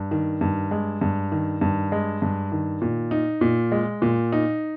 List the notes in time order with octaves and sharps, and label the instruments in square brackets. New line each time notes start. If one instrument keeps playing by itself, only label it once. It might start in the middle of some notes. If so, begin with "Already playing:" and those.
Already playing: [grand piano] G2
D#3
G2
G#3
G2
D#3
G2
G#3
G2
D#3
A#2
D#4
A#2
G#3
A#2
D#4